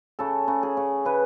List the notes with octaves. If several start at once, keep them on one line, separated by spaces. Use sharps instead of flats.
C#3 A4
C#3
G#4
C#3
C#3 B4